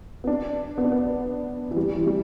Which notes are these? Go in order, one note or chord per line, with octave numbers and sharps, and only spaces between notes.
B3
D4
B3
D4
B3
E3
G3
E3
G3